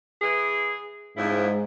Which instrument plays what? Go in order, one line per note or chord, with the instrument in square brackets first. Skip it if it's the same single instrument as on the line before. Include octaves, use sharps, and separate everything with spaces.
[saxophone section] E3 G#4
[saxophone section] F2 C#3 E4 [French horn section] G#2 G#3